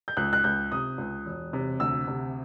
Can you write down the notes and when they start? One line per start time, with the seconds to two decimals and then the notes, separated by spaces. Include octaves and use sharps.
0.08 G6
0.17 C#2 F#6
0.33 F#6
0.44 C#2 G6
0.72 C3 D#6
0.98 C#2
1.26 E1
1.53 C3
1.80 D2 E6
2.07 C3